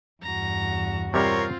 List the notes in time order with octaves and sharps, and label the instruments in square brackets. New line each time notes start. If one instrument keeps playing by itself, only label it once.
[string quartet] E2 G2 F#4 [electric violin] A#5
[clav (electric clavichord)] C3 G3 [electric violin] C4 F4 [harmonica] A#4 C#5